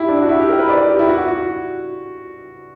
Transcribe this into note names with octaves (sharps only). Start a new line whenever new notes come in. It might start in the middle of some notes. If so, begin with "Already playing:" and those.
Already playing: E4 G4
D4
F#4
E4
G4
A#4
B4
D5
G4
E4
F#4
F#4